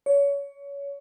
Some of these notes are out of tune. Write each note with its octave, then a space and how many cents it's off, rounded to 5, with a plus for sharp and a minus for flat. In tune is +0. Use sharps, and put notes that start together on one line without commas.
C#5 +25